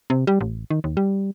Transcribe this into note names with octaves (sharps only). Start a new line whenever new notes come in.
C3
G3
A1
D#3
D#2
G3